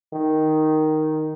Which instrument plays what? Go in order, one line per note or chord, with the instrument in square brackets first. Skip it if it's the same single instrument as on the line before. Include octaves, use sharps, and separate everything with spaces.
[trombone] D#3